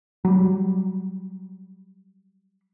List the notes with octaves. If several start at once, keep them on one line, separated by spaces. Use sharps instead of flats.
F#3 G3